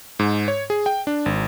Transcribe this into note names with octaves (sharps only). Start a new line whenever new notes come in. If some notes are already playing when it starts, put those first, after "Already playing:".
G#2
C#5
G#4
G5
D4
G#1